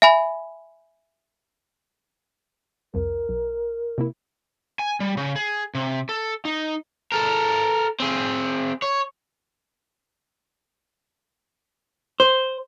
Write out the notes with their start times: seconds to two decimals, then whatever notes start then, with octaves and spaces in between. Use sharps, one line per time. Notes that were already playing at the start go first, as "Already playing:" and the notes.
0.02 E5 G#5 B5
2.94 C2 F2 A#4
3.29 B1
3.98 C3 A#3 E4
4.79 G#5
5.00 G3
5.17 C#3
5.36 G#4
5.75 C3
6.09 A4
6.45 D#4
7.12 A4 A#4
8.00 C4 G#4
8.82 C#5
12.20 C5